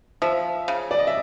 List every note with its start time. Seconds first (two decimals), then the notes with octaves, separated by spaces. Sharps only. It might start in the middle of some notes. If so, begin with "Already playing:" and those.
0.22 F3 E5
0.68 C#3
0.91 D5
0.99 D#5
1.07 E5